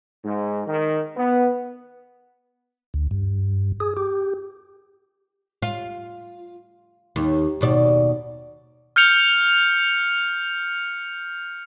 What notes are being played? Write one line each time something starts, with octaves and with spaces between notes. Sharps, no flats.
G#2
D#3
B3
D2
G2
G#4
G4
F4
D#2
D#2 B2 D5
F6 G6 C#7 F7